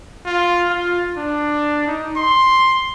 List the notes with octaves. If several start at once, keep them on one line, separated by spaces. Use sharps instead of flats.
F4
F4
D4
D#4
C6